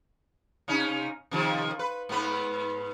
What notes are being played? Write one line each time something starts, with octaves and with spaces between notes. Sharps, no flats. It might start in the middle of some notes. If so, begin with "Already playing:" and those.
C3 C#4 D#4
C3 D#3 F3
B4
G#2 B3 B4